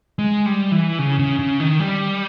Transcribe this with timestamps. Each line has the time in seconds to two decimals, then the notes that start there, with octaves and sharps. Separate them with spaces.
0.19 G#3
0.46 G3
0.72 E3
0.99 C#3
1.19 C#3
1.39 C#3
1.60 D#3
1.80 G3